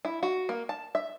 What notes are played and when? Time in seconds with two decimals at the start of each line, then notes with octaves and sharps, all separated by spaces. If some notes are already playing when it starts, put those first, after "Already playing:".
0.05 E4
0.23 F#4
0.49 A#3
0.69 A5
0.95 E5